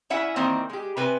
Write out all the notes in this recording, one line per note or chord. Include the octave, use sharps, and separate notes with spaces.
C#4 E4 E5 F#5 G#5
D#3 E3 A#3 C4
G#3 G4
C3 B4 G#5